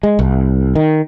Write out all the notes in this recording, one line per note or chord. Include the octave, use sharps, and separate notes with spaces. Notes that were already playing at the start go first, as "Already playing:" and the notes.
G#3
C2
D#3